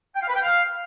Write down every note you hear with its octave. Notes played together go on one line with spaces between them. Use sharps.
G5
F5
B4
G5
F5